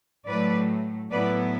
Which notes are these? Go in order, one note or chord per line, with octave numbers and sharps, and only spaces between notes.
A2 F#3 A3 B4 D5
A2 F#3 B3 E4 B4 D5